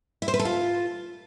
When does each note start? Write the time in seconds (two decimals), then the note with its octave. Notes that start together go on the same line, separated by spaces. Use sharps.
0.22 E4
0.28 C5
0.34 B4
0.39 A4
0.45 F4